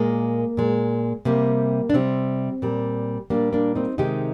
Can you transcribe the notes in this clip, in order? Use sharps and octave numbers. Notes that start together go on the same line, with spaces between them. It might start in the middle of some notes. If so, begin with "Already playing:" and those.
Already playing: A#2 G#3 A#3
A#2 G#3
C3 G3 A#3
D4
C3 G3 C4
A#2 G3
A#2 G3 A#3 D4
A#3 D4
C4 D#4
C3 D#3 G#3 D#4 G4